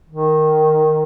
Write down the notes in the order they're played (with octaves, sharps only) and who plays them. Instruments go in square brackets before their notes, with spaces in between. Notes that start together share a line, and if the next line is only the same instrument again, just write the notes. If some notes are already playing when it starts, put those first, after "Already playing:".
[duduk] D#3